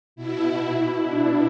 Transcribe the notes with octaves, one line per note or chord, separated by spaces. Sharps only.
B2 E4
D4